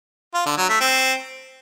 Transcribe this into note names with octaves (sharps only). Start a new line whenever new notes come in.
F4
D3
F#3
A3
C4